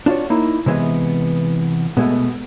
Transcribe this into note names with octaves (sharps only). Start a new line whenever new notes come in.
D4 F4 F#4 C#5
A#3 D#4 E4
C3 E3 G#3 B3
B2 G#3 A3 B3